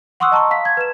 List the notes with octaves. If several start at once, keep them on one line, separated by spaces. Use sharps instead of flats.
F#5 C6 C#6 D#6 E6 F#6
D#5 A5 A#5 C6 C#6
F5 B6
G#6
B4 E7